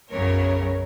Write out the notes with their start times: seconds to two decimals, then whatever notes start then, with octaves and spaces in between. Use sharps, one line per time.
0.10 B1 F#2 C#3 F#3 A#4 C#5